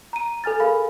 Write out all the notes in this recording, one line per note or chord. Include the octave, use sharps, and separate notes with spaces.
A#5 D#7
A4 G#5 F6 A6
G#4 A#4 F5 B5